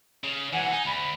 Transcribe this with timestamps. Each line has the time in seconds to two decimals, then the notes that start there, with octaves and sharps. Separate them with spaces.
0.24 C#3
0.53 E3 F#3 F#5 G#5
0.71 D#4 G#5
0.85 D2 B5